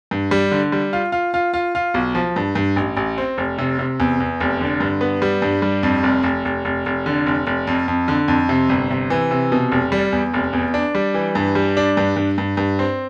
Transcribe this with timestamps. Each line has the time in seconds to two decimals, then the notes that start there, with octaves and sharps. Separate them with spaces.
0.11 G2
0.31 G3
0.52 D3
0.72 G3
0.93 F4
1.12 F4
1.34 F4
1.54 F4
1.75 F4
1.94 B1
2.15 F3
2.36 G2
2.55 G2
2.76 A1
2.97 A1
3.18 C4
3.38 F1
3.58 C3
3.79 C3
4.00 E2
4.20 E2
4.40 F1
4.61 D3
4.80 G2
5.01 B3
5.22 G3
5.42 G2
5.62 G3
5.83 F2
6.03 F1
6.23 F1
6.45 F1
6.65 F1
6.86 F1
7.06 D3
7.27 F1
7.47 F1
7.67 F2
7.88 F2
8.08 D3
8.28 F2
8.49 C3
8.69 G1
8.90 C3
9.10 E3
9.31 C3
9.52 B2
9.72 F1
9.92 G3
10.13 E2
10.34 F1
10.53 E2
10.74 D4
10.95 G3
11.14 E3
11.35 G2
11.55 G3
11.77 D4
11.97 G2
12.16 G2
12.38 G2
12.57 G2
12.79 C4